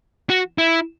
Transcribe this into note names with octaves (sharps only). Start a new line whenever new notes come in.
F#4
E4